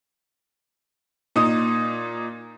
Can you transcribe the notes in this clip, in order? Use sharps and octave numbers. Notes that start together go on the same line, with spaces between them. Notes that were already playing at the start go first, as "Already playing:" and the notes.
A#2 D#4 D#6